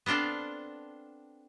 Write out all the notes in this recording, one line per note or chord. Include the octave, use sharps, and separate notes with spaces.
B3 C4 D4 F4 A4